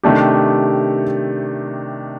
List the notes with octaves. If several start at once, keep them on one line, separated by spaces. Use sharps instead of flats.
C3 D#3 A3 D4 G4